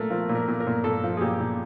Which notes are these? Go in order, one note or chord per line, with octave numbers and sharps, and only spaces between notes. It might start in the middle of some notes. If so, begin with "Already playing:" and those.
Already playing: A#2 A3 A#4
F3 A#4
A#2
A#4
A#2
A#4
A#2
A#2 A4
F3
G#4
A#2 G4
A#2